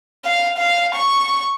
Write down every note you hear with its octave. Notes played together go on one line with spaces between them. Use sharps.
F5
F5
C#6